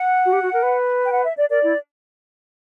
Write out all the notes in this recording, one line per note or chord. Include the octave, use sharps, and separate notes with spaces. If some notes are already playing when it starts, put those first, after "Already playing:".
Already playing: F#5
F#4
G4
F#4
A#4
B4
G5
F#5
E5
D5
A#4 D5
E4